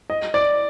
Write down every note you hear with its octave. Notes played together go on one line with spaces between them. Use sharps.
D#5
D5